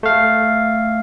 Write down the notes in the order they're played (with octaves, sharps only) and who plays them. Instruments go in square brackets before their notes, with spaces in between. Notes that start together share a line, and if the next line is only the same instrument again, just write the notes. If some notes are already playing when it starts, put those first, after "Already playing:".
[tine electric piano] A3 F5